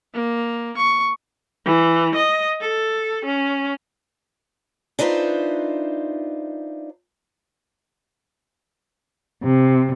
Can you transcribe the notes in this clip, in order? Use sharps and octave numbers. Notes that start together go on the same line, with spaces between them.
A#3
C#6
E3
D#5
A4
C#4
D4 D#4 F4 B4 C5 E5
C3